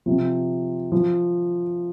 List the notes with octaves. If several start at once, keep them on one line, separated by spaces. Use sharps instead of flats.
C3 F3
F3